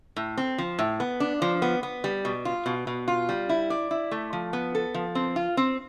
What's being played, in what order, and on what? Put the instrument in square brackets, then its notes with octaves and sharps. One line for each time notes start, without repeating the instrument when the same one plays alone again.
[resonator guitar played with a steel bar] A2
C4
F3
A2
B3
D4
F3
B3
B3
G3
B2
F4
B2
B2
F4
G3
E4
D5
E4
A3
F3
B3
A4
F3
C4
F4
C4